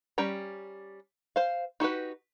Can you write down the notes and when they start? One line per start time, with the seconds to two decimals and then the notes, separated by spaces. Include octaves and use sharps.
0.18 G3 C#4 G5 A#5
1.36 C5 F5
1.80 D#4 F#4 G4 B4